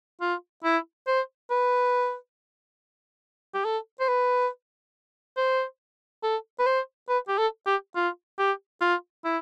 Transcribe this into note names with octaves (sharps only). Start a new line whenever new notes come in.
F4
E4
C5
B4
G4
A4
C5
B4
C5
A4
B4
C5
B4
G4
A4
G4
F4
G4
F4
E4